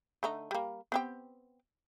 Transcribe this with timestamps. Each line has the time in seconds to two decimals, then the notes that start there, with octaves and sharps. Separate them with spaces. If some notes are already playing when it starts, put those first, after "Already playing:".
0.23 D3 A3 D#4
0.51 G3 A#3
0.92 B3 C4 G4